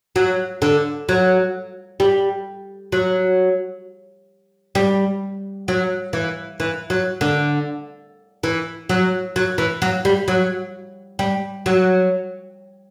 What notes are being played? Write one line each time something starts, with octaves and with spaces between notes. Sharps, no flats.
F#3
D3
F#3
G3
F#3
G3
F#3
E3
E3
F#3
D3
E3
F#3
F#3
E3
F#3
G3
F#3
G3
F#3